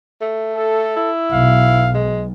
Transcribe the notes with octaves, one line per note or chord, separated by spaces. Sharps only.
A3
A4
E4
B1 F5
G#3